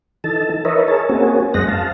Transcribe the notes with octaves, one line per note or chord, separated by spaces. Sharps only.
E3 D#4 A4 A5
A#4 B4 C#5 D#5 E5
G#4 A#4 C#5 A5
A#3 C4 C#4 F#4 G#4
F#2 G#3 C5 D#5 F#5 A#6
F5 A5